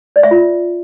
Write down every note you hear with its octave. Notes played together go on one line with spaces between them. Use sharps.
D5
E5
F4